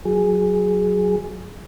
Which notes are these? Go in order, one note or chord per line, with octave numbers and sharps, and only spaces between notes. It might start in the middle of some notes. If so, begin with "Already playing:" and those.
F#3 G#4